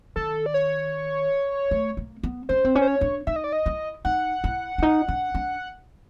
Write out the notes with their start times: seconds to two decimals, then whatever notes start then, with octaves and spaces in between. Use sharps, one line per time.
0.16 D#3 A4
0.46 D5
0.54 C#5
1.71 A3
1.97 A#3
2.23 B3
2.49 C#4 C5
2.65 C4
2.75 C#4
2.81 C5
2.88 C#5
3.01 D4
3.27 D#4 E5
3.36 D#5
3.44 D5
3.53 D#5
3.66 E4
4.05 D#4 F#5
4.44 E4
4.78 D4
4.82 D#4
5.08 D4
5.35 D4